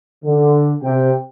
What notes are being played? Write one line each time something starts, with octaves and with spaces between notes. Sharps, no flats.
D3
C3 G5